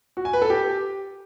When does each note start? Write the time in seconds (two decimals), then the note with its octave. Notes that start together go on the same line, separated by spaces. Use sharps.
0.17 F#4
0.25 G#5
0.33 B4
0.42 A4
0.50 G4